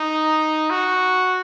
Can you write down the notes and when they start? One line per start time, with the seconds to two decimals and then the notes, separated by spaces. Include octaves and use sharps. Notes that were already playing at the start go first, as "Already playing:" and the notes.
Already playing: D#4
0.70 F#4